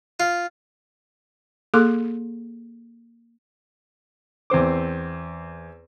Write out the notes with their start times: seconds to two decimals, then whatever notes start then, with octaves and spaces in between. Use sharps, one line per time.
0.20 F4
1.74 A#3 G#4 A4 C6 D6
4.50 E2 C4 C5 D6